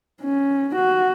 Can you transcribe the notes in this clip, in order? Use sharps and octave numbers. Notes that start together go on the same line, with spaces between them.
C#4
F#4